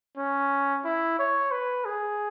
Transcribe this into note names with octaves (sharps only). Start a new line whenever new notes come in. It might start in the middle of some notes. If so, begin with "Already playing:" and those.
C#4
E4
C#5
B4
G#4